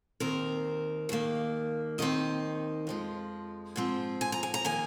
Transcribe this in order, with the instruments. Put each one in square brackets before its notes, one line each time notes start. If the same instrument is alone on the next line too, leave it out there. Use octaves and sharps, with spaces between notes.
[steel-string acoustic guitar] D#2 D#3 C4 A#4
D#2 D#3 A#3
D#2 D#3 C4 D#5
F2 F3 G#3
G#2 F3 C4
G#5
A#5
G#5
A#5
D#3 A#3 G#5